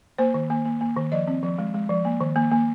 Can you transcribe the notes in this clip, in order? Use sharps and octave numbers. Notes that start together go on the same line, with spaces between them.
A#3 C5
D#3
A#3
A#3
A#3
D#3
F3 D#5
C4
F3
G#3
G#3
F3
A#3
D#3
A#3
A#3